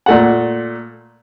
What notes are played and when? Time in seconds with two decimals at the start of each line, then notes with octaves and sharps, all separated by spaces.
0.06 A#2 A3 F#5